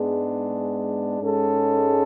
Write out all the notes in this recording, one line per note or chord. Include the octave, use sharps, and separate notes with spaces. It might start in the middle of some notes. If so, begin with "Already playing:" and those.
Already playing: G#2 G#3 B3 D4 G#4
G#2 G#3 C#4 A4